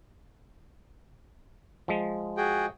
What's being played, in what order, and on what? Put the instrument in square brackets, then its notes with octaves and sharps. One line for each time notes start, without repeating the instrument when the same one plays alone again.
[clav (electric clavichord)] F3 G#3
[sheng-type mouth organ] F#4 G#4 G5